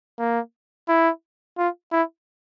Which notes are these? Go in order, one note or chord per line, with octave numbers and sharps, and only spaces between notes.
A#3
E4
F4
E4